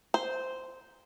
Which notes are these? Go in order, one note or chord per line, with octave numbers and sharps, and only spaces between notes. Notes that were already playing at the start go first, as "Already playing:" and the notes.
C5